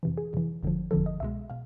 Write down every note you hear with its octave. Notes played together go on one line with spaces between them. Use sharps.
F2 C3 E3
G#4
F2 C3 E3
G1 F2 D3 F3
G1 F2 D3 F3 A4
D#5
C2 B2 G#3 E5
B2 F5